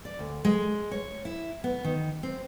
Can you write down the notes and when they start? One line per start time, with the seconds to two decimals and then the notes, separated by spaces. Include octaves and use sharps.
0.05 D5
0.19 D2
0.45 G#3
0.91 C#5
1.25 E4
1.64 B3
1.84 D#3
2.23 C4